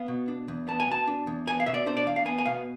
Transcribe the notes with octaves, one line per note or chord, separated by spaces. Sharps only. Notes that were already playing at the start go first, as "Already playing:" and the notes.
Already playing: B3 F5
B2
D4
E2
B3 A5
G#5
B2 A5
D4
E2
B3 G#5
F5
B2 E5
D5
D4 C5
D5
E2 F5
F5
B3 G#5
G#5
B2 F5